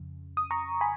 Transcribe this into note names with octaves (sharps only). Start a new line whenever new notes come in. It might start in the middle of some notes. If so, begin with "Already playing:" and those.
Already playing: F2 C#3
D#6
A#5 C#6
G#5 B5